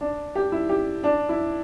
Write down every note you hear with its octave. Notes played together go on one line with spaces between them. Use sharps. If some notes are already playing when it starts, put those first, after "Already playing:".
D4
G4
E4
G4
D4
E4